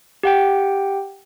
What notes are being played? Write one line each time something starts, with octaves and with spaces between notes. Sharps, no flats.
G4 F#5 G5